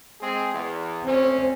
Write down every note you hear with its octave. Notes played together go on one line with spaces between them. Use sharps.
G#3 C4 G#4
E2
D2 C4 C#4